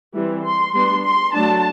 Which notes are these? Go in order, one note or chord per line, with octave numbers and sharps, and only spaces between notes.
E3 G3 C4
C6
G3 B3 D4 C6
C6
F#3 A3 D4 A5